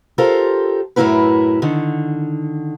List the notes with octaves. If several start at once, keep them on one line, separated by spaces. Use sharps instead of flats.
F4 G4 A4 A#4 C5
F#2 A2 F#3 E4 A#4 B4
D3 D#3